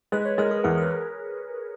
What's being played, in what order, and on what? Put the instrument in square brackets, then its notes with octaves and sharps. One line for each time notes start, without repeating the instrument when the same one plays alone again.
[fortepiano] G#3 [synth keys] B4
[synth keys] C#5
[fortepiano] G#3 [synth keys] A#4
[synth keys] G#4
[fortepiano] E2 [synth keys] G#4
[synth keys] A#4
B4